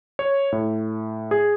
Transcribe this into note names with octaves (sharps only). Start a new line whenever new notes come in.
C#5
A2
G#4